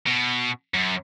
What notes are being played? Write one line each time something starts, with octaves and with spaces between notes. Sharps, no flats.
B2
F#2